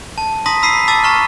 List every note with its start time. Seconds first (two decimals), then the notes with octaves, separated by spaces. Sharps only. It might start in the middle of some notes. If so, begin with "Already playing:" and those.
0.18 A5
0.46 A5 A#5 C6 D#6 A#6 B6
0.63 B5 E6 B6 C7 D#7
0.88 A5 D6 E6 A6 B6
1.04 A5 A#5 C#6 F6